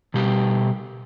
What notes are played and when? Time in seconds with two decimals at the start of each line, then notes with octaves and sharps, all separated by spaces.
0.14 B2 G3 G4